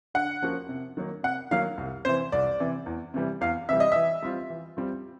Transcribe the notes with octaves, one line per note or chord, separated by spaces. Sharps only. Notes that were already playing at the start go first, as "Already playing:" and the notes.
D3 F#5
F3 A#3 C#4 F#4
C3
D#3 F#3 A#3
C3 F#5
D#3 F#3 A#3 F5
C2
C3 E3 C5
C2 D5
C3 E3
E2
C3 E3 G3
E2 F5
C3 E3 G3 E5
D#5
E3 E5
G3 C4 F4
E3
G3 C4 F4